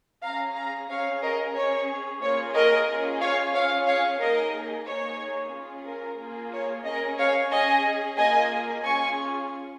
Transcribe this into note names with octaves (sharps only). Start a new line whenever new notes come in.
C#4 G#4 F5 A#5
F5 A#5
C#4 G#4 C#5 F5
A#4 D#5
C#4 G#4 C#5
A#3 F4 G#4 C#5
A#4 D#5
C#4 F4 G#4
C#5 F5
C#4 F4 G#4 C#5 F5
C#5 F5
A#3 D#4 G#4 A#4 D#5
A#3 D#4 G#4 C#5
C#4 F4 G#4
A#4
A#3 F4 G#4
C#5
C#4 G#4 A#4 D#5
C#5 F5
C#4 G#4 D#5 G#5
A#3 F4 G#4 D#5 G#5
C#4 F4 G#4 G#5 C#6